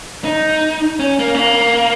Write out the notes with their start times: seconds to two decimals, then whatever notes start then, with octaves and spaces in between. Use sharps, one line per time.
0.24 D#4
1.00 C#4
1.19 A#3
1.35 C#4
1.39 A#3